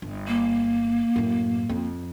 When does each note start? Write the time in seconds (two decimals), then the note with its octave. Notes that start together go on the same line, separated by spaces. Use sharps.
0.02 G1
0.27 A#3
1.16 F#2 A2
1.69 F2